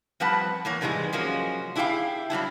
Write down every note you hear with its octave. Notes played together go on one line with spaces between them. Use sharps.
F3 G3 C4 B4 F#5 A5
E2 A#3 C#5
G#2 C3 E3 G3 G#3
F3 F#3 G#3 A#3 C#4
D4 E4 G4 G#4 F5 G5
F#3 G3 D4 E4